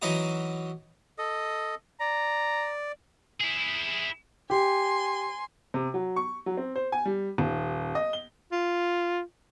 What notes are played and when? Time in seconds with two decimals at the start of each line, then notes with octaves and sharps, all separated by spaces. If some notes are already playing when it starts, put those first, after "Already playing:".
0.02 E3 F#3 C#4 D#4 E4 F#4
1.18 A4 D#5 D#6
2.00 D5 A#5
3.40 E4 G#4
4.50 G4 G#5 C6
5.74 C3
5.94 F#3
6.16 C#6
6.46 F#3
6.57 C4
6.76 C5
6.92 G#5
7.06 G3
7.38 D#1
7.95 D#5
8.13 G7
8.52 F4